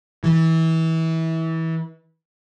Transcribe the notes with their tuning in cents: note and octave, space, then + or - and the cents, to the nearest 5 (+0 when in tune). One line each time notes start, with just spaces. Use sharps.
E3 -25